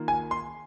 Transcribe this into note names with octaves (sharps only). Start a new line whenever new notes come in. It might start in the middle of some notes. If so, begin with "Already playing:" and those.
Already playing: D#3 A#3 F4
G#5
C6